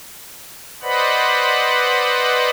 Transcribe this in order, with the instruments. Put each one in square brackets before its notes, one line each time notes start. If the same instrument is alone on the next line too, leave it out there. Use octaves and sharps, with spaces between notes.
[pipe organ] B4 C5 D5 D#5 F#5 B5